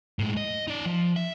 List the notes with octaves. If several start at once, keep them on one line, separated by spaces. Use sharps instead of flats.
A2 G#3
D#5
D#4 D5
F3
E5